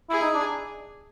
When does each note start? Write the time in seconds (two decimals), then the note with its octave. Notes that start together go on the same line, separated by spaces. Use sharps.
0.10 E4 G#4
0.22 D#4
0.35 D4